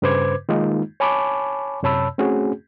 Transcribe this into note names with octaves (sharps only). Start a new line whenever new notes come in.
G2 C#3 B4 C5 D6 G#6
D#3 G#3 A#3 D#4 F4
C#5 G#5 A5 B5 C#6 D6
F#2 C3 C#5 A5 B5 E6
A3 C4 C#4 F#4 G#4